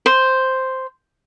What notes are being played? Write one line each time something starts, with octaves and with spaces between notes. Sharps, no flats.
C5